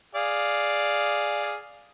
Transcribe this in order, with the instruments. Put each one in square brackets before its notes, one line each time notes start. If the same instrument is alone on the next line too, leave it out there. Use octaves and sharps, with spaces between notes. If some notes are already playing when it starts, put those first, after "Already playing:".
[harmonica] G#4 D5 F5